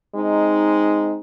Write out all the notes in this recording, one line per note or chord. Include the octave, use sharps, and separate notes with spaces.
G#3 C4 D#4